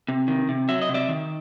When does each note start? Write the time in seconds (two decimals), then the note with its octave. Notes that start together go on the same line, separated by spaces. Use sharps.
0.08 C3
0.28 D#3
0.49 C3
0.69 F#3 E5
0.82 D#5
0.89 C3
0.94 D5 E5
1.09 D#3